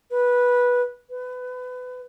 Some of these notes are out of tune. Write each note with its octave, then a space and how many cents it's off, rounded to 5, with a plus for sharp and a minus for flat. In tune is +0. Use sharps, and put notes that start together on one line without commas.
B4 -15
B4 +25